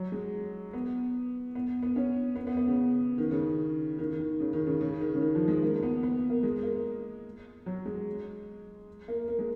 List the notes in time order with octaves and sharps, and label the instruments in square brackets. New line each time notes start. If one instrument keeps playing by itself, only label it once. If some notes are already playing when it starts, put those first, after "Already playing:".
Already playing: [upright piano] F#3
G#3
B3
B3
B3
C#4
B3
B3
B3
C#3
D#3
C#3
D#3
D#3
C#3
D#3
C#3
C#3
D#3
C#3
D#3
F3
G#3
A#3
B3
B3
A#3
G#3
A#3
F#3
G#3
A#3
A#3
G#3